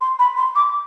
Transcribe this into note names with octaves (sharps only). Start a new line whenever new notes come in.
C6
B5
C6
D6